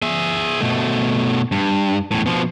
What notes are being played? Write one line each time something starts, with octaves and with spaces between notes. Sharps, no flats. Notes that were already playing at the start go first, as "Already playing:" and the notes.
G#4 E5
B2 A3
G2
E2 A2
B2 F3